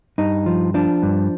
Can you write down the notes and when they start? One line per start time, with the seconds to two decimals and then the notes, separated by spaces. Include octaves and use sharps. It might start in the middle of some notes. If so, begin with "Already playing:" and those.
0.18 G2 D#4
0.46 F3
0.74 F3 D4
1.03 G2